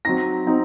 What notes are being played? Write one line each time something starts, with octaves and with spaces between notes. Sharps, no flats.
F#3 C4 D#4 A#6
F#3 C4 D#4